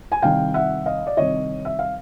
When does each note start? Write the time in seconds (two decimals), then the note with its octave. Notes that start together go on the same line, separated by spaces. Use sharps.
0.12 G#5
0.22 C2 C3 D#3 F5 G5
0.54 E5 F#5
0.86 D#5 F5
1.07 D5
1.17 C2 C3 D#3 C#5 D#5
1.65 E5
1.79 F5